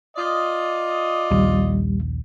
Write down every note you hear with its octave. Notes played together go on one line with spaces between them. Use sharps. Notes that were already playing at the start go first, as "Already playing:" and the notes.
F4 D5 D#5
A#1 D#2 G3